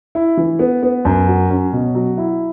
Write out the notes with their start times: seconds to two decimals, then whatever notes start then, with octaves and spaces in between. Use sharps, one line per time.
0.15 E4
0.37 E3
0.59 B3
0.83 B3
1.05 F#2
1.28 F#3
1.50 C#4
1.73 B2
1.95 F#3
2.18 E4